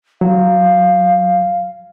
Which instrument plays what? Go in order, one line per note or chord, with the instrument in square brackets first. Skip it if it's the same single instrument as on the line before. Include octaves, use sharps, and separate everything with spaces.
[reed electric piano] F#3 [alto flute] F5